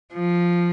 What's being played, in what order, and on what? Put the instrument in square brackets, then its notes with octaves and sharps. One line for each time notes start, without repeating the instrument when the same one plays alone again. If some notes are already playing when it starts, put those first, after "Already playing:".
[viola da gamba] F3